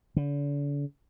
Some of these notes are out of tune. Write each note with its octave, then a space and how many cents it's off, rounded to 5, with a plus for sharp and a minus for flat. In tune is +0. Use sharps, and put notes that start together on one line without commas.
D3 -40